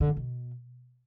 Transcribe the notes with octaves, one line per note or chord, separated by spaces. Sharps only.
D3
A2
B2